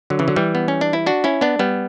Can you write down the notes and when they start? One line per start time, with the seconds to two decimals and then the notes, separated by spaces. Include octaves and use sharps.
0.10 D3 F#3
0.19 C#3 E3
0.28 D3 F#3
0.36 E3 G3
0.55 B3
0.68 C#4
0.81 D4
0.93 E4
1.07 D4 F#4
1.24 C#4 E4
1.41 B3 D4
1.59 G3 B3